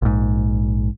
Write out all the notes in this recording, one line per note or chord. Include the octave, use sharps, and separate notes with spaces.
A#1 G#2